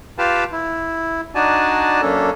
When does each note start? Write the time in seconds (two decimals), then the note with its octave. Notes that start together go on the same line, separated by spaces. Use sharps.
0.18 F4 G4 B4 F5 G5 A5
0.52 E4
1.35 D4 D#4 F#4 D5 G#5 A5
2.02 F#2 A#3 C#4 D4 A4